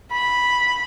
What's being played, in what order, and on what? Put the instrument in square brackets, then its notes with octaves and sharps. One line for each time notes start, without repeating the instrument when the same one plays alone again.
[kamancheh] B5